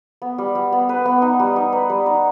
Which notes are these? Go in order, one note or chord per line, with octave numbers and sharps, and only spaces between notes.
B3
G3
G3
B3
B4
B3
D#4
G3
D#4
B4
G3
D#4